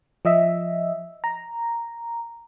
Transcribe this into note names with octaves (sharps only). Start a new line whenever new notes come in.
F3 D#5 E5
A#5